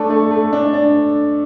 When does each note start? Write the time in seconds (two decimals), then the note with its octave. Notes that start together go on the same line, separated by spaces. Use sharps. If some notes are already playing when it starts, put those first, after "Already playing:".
Already playing: A3 D4 A4
0.10 A3
0.31 A3
0.53 D4
0.73 D4